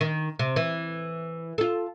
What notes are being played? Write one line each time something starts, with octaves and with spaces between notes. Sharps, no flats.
D#3
C3
E3
F4 A4